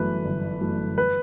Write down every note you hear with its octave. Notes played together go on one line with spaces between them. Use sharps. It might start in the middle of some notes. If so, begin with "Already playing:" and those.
Already playing: G1 F#2 E3 A3 B4
G1
F#2 E3 A3
B4